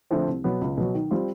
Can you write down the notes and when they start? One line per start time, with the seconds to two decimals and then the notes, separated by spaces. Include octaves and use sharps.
0.11 D3 F3 A3 C4
0.28 C2
0.44 B2 F#3 B3
0.61 C#2
0.77 B2 F#3
0.94 D#3
1.11 G3 C4 F4